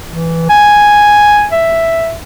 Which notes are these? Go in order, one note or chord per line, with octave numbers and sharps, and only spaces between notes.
E3
G#5
E5